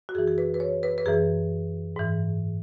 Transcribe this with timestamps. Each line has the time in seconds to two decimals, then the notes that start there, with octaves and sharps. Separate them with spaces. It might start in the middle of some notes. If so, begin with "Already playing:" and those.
0.09 F#4
0.15 F#2 E3 G#4
0.27 G#4
0.38 B4
0.54 B4
0.60 C#5
0.83 B4
0.98 B4
1.06 F#2 E3 G#4
1.96 G#2 E3